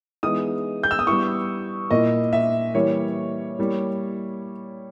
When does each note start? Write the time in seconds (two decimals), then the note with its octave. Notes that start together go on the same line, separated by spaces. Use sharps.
0.23 E3 G#3 B3 D#4 D#6
0.83 G6
0.91 E6
0.99 D#6
1.07 G3 B3 E4 C#6
1.91 A#2 A#3 E4 D#5
2.33 E5
2.74 E3 G3 A#3 C#5
3.59 G3 A#3 E4